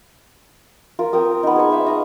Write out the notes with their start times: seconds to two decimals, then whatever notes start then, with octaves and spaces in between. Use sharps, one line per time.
0.99 F4 A#4
1.13 C4 A#4 D#6
1.43 B3 D#4
1.56 G#4 C#6
1.71 D#4 E5 F5
1.86 D#5 A#5